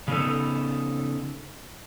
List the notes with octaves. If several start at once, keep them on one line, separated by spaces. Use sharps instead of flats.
C#3 B3 D#4 A4